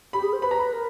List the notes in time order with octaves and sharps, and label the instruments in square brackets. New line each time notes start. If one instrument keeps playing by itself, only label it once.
[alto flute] G4 [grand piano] B5
[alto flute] G#4
C5
[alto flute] B4 [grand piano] B5
[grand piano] A#5
B5
[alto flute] A#4